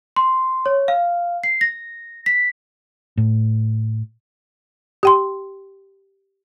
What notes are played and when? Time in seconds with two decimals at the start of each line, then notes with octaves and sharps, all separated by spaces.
0.16 C6
0.66 C#5
0.88 F5
1.44 C7
1.61 A#6
2.26 B6
3.17 A2
5.03 G4 G5 C6